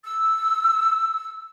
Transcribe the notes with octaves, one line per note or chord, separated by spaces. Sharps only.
E6